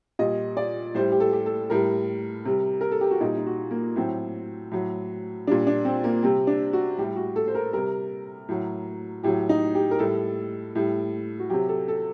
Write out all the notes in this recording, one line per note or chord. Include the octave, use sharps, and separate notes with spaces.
A#2 G3 D#5
D5
A2 G3 C5
G4
A4
G4
A4
A2 G3 A#4
C3 G3
A#4
A4
G4
F#4
A#2 G3 D#4
D#4
F#4
A#3
A2 F#3 C4
A2 F#3
A#2 G3 D4
D4
C4
A#3
C3 G3 C4
D4
F#4
A2 G3 G4
F#4
A4
C5
A#4
C3 G3 A#4
A2 F#3
A2 F#3 G4
D#4
G4
A#4
A2 G3 A4
A2 G3
F#4
C3 F#3 G4
A4
A4